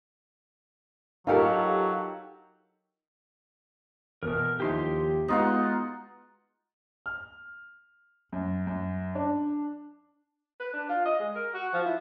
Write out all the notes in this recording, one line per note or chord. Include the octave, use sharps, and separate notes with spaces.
F#3 D#4 F4 G4 A4 A#4
E2 B2 A#4
D#2 F3 D#4 E4 G4 C6
G#3 B3 D#4 F4 F#4 F#5
F6
F#2
F#2
D4
B4
D4
F4
D#5
G#3
A#4
F#4
F3
E4